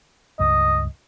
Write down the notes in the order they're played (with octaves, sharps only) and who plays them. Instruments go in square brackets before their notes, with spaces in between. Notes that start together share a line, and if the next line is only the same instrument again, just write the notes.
[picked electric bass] C#2 G2 [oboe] D#5